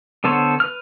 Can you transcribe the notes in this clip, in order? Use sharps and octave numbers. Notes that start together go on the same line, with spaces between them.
D3 B3 A4 C5 C#5
B4 F6